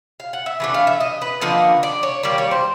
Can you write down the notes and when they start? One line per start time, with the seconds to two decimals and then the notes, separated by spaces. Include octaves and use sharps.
0.20 F5
0.33 F#5
0.46 E5
0.60 E3 A3 D4
0.74 F5
0.87 E5
1.00 D#5
1.22 B4
1.41 D3 F3 A#3 D#4
1.83 D5
2.03 C#5
2.23 D#3 G3 A#3 D5
2.38 C#5
2.51 C5